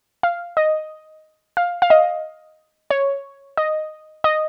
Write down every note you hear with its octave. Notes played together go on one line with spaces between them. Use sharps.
F5
D#5
F5
F5
D#5
C#5
D#5
D#5